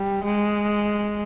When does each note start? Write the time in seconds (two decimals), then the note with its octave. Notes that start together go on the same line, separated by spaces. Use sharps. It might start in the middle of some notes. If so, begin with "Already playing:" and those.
Already playing: G3
0.24 G#3